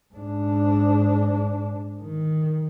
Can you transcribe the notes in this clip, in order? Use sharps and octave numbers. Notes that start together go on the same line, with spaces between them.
G#2 D4
D#3